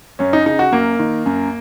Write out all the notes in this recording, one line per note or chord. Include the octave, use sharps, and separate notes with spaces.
F#2 C#4
D#4
C#3 D#4
F#4
F#2 A#3
D#3
F#2